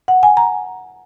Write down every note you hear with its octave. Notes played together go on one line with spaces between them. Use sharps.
F#5
G#5
A#5